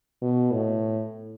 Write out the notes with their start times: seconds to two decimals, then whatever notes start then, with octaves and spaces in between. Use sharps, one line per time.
0.22 B2
0.52 A2